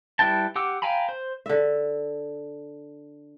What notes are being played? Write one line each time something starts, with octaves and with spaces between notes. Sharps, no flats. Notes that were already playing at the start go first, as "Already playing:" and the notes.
G3 E4 B4 G5 A5
G4 F#5 D6 E6
F5 G5 G#5 A#5 B5
C5
D3 E5